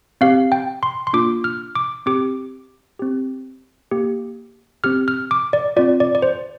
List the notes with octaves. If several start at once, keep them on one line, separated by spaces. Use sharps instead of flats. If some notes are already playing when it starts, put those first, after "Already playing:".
C4 G4 F5
G5
C6
C6
A#3 D4 F4 D6
F6
D6
C4 G4 D6
C4 G4
A#3 G4
C4 G4 F6
F6
D6
D5
C4 F4 D5
D5
D5
C5